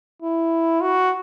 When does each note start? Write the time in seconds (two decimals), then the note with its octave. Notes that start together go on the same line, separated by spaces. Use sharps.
0.22 E4
0.81 F#4